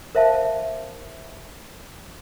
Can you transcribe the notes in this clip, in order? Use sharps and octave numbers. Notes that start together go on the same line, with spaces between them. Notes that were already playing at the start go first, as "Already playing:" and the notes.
A#4 C5 E5 F5 A5